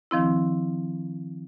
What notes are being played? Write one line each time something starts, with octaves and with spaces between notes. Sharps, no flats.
D#3 F3 C4 E4